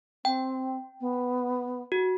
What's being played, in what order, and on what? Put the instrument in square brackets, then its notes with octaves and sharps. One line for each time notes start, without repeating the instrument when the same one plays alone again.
[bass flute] C4 [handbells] G5
[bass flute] B3
[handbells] F#4